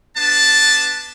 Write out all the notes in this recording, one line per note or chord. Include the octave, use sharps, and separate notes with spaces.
B3 D4 A5